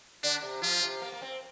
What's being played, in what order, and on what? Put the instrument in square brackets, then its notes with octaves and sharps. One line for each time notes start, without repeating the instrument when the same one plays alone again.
[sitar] D3 [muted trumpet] D4
[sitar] C3
[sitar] F3 [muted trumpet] F4
[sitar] C3
A#3
A#3
C4